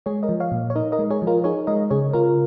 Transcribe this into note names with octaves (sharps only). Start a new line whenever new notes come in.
G#3 G#4 C#5
A#4 D#5
F3
C#5 F5
A#2
C#5
D#4 A#4 D#5
A#4 D#5
G#3
G#4 C#5
F3
F4 A#4
D#4 G#4 C#5
G#3 A#4 D#5
C#3 G#4 C#5
C#3 F4 A#4